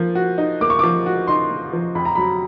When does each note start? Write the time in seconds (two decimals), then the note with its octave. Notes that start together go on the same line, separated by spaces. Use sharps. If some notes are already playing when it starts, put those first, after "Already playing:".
Already playing: F3 A#3
0.15 F#4
0.38 D#4
0.61 A#3 D6
0.70 C#6
0.79 F3 D6
1.06 F#4
1.27 D#4 C6
1.50 A#3
1.73 F3
1.95 F2 B5
2.05 A#5
2.15 F#3 B5